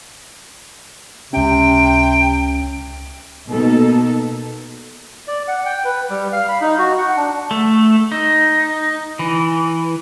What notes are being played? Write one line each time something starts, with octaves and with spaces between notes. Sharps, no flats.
C#2 C3 C#4 G5
B2 A#3 D#4 A4
D5
F#5
G5
B4
G3
F5
B5
D#4
F#4
F#5
D4
A3
D#4
E3